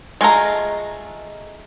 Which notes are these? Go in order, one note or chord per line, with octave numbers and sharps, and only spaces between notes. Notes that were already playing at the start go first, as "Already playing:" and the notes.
G#3 A3 F4 A#5